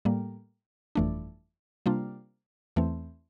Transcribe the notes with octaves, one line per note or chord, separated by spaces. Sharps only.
A2 G3 A#3
G1 F2 E3 A3 D4
C3 G3 A#3 D4 F4
E2 E3 A3 C4